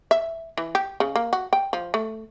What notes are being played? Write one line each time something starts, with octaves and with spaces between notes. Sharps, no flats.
E5
E3
G4
C#3
A#3
F#4
G5
F3
A3